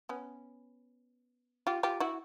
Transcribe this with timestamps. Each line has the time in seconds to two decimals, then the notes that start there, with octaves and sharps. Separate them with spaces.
0.09 B3 C#4
1.67 F4 G4
1.83 F4 G4
2.00 E4 F#4